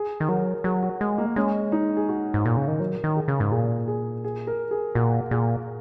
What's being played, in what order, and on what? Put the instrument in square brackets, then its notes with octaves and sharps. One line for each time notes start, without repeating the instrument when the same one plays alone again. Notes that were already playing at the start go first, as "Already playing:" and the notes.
Already playing: [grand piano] G#4
[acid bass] D#3
[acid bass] F#3 [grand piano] A#4
[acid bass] F#3 [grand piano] G#4
[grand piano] F#4
[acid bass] G#3
[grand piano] A#3
[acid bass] G#3 [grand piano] C#4
[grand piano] D#4
G#4
F#4
[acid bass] G#2
A#2
C#3
D#3
[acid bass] F#3 [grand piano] A#4
[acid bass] D#3
[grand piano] G#4
[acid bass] C#3
G#2
[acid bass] A#2 [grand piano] G#4
[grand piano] G#4
G#4
A#4
G#4
[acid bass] A#2 [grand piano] F#4
[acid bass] A#2 [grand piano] G#4